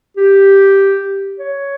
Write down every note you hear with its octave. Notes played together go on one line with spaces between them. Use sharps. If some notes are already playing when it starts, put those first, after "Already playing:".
G4
C#5